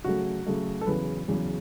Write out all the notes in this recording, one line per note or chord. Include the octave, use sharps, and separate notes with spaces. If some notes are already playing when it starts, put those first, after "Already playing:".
C#3 F#3 A3 F#4
C#3 F#3 A3
A4
E2 C#3 F#3 B4
E2 C#3 F#3